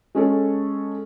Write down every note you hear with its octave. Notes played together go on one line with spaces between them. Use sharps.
G#3 C#4 A4